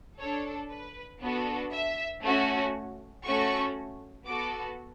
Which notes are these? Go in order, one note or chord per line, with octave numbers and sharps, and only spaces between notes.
D4 A4 C#5
B4
B3 D4 F#4 A4
E5
A3 C#4 F#4
A3 C#4 F#4 A4 C#6
B3 F#4 A4 D6